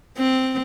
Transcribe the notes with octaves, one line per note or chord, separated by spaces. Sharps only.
C4